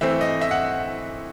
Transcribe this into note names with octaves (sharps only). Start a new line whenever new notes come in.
E3 A3 C4 E5
D#5
E5
F#5